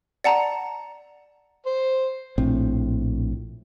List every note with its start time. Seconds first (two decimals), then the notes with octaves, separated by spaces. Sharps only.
0.24 D5 F#5 A5 A#5
1.66 C5
2.38 A#1 A2 C4